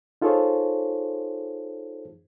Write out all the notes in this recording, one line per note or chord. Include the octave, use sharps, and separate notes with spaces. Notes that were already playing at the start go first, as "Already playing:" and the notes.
D#4 F4 G#4 A4 C5 C#5